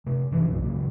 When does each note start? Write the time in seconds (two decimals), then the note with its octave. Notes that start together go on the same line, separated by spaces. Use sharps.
0.06 C3 A3
0.31 F#1 E3 F3
0.46 B1 F#2 B2 F3
0.62 A#2 C#3 F#3